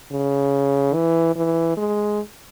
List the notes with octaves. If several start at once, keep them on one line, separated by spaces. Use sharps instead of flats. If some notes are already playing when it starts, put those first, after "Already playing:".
C#3
E3
E3
G#3